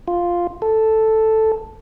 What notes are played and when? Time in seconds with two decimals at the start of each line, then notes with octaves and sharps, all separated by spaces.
0.08 F4
0.62 A4